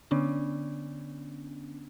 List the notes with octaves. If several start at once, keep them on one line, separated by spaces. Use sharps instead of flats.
D3 B3 C#4 D4